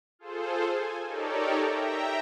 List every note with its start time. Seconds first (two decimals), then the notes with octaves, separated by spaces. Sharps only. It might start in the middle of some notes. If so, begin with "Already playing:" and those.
0.19 F4 G#4 A4 C5
0.69 G#5
1.05 D#4 G4 A4 A#4 C#5 D5
1.60 E5 G5 A#5